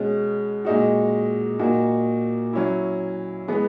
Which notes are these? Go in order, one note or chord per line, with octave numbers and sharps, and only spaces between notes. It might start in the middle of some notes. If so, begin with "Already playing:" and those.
Already playing: B2 G#3 C#4
A#2 G#3 D#4 F#4
A#2 A#3 D#4 F#4
F#3 C#4 E4
E3 G#3 B3